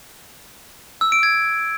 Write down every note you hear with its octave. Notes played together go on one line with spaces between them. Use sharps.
E6
D7
G#6